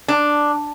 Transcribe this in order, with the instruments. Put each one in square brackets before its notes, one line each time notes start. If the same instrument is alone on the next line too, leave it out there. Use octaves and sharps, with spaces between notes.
[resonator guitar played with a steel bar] D4